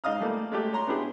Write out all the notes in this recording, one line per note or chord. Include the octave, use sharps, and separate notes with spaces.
G#2 D#5 F5 D#6 F6
G3 A3 A#3
G#3 A3 G4
C#5 A#5 C6
B3 D4 E4 G4 G#4